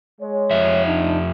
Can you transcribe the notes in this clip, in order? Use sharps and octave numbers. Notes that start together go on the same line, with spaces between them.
G#3 C#5
F2 E5
D4 D#4